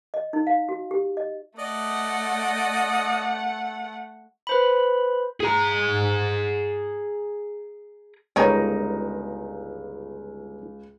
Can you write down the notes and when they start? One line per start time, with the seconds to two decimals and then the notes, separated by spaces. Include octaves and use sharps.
0.14 D#5
0.33 D#4
0.47 F5
0.69 F#4
0.91 G4
1.17 D#5
1.59 A3 D5 D#5 F#5
4.47 B4 C5 B5
5.40 G#4 A#5
8.36 G1 C#2 C#4 D#4 A#4 B4 C#5